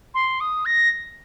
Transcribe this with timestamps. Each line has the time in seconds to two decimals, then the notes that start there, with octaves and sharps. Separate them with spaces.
0.14 C6
0.40 D#6
0.66 A#6